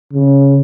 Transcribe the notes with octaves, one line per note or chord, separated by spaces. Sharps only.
C#3